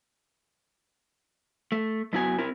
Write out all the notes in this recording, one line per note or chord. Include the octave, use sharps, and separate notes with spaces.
A3
F#2 B3 E4 F#4 G4 G#5
C4 E4 A#4